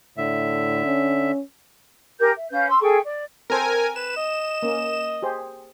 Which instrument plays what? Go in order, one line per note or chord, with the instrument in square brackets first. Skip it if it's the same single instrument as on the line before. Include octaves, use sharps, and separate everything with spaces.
[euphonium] A2 [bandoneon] D3 E5
[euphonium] C#4
[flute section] G4 A#4 G#5 G6
E5
C#4 B4 F5 G6
C6 E6
G#4 A4 G5 C#6
D5
[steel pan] C4 A4 C5 [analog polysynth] A#4 G#5
[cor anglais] B4 [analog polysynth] E7
[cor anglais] D#5
[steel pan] A#3 C#4
G4 G#4 C5